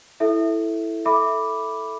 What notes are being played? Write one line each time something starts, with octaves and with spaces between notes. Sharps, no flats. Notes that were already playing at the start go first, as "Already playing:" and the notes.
E4 A4 E5
A4 E5 B5 D6